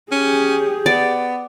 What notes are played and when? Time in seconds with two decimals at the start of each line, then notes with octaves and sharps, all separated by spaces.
0.12 C#4 G4 G#4
0.86 B3 D5